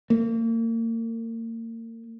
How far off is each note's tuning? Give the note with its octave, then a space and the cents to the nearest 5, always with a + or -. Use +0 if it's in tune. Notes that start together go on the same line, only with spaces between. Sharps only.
A#3 -35